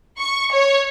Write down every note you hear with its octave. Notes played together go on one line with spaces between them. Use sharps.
C#6
C#5